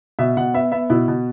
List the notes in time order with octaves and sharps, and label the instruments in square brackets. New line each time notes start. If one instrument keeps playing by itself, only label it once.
[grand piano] B2 E5
B2 F#5
B3 E5
B3 E5
B2 E4
B2